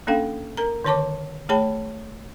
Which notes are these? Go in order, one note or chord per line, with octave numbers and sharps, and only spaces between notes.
A#3 C#4 D4 A4 F5 G5
A#4 A#5
D3 D#3 C#5 A5 C#6 D6
A3 G#4 C#5 G5 A5 B5